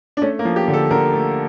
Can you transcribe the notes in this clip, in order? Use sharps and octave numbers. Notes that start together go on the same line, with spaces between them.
D4
A3 C#4
A#3
F3
G4
D3
A4
D3 A#4
A3